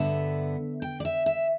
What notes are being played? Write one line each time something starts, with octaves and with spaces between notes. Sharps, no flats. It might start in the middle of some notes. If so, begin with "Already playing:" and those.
Already playing: G2 D3 B3 E5
G5
D5
E5
E5